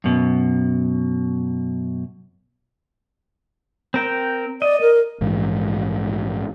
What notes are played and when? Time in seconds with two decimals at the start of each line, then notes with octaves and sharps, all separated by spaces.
0.04 F#2 B2
3.94 C4 A#4 G5
4.62 D5 D#5
4.81 A#4
5.21 A#1 G#2 E3